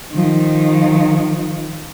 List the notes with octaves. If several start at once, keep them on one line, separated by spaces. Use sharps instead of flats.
D#3 F3